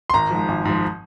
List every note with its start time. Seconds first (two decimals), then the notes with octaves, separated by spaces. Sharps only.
0.10 C6
0.13 G#1 A#5
0.31 G#2 F3
0.48 G#1
0.65 G#2 F3